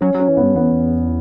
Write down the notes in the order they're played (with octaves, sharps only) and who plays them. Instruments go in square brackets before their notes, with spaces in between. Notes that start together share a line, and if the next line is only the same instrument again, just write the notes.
[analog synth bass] F#3 [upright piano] C#4
[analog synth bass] F#3 [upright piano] C#4
[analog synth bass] E3
[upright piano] B3
[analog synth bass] G2
[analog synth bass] E2 [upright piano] B3